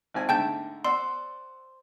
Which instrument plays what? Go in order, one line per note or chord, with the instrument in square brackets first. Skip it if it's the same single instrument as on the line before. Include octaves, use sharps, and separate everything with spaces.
[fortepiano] G#1 C4 G#5
[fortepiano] G#2 D3 A3 [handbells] G5 A5 G6
[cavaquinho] C5 [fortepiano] D5 F#5 E6 [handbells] C6